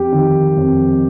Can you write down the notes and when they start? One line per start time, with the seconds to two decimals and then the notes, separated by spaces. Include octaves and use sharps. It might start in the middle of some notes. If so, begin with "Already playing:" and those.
Already playing: F2 G4
0.12 D#3
0.57 F2